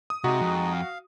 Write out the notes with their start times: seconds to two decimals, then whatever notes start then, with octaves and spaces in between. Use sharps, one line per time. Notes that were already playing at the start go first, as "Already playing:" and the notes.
0.10 D#6
0.24 C3 G#3 D#4 F#4
0.41 F2
0.72 F5